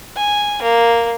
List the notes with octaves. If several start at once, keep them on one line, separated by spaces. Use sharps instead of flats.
G#5
A#3